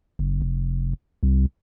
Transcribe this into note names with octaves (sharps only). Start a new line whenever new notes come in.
F#1
F1
C2